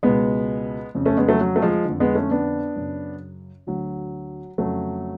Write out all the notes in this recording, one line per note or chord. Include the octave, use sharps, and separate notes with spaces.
C#2 B2 G#3 B3
F2 C#3
A3 C#4
G#3 B3
F#3 A3
F#3
A3
F3 G#3
F2 D3
G#3 B3
A3 C#4
B3 D4
F#2 C#3
D2 D3 F#3
F2 C#3 F#3 A3